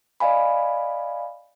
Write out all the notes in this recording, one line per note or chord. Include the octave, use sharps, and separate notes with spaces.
D5 D#5 F5 G#5 B5